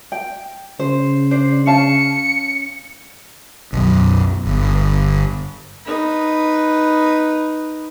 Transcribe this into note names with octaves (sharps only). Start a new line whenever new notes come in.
G5
C#3 C5
D4 C5
C#4 F5 A5 C#7
B1 F#2
G1
D#4 B4